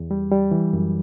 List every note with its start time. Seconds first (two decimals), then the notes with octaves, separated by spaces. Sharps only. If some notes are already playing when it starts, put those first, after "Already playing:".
Already playing: E2
0.11 G3
0.32 G3
0.51 E3
0.73 F#2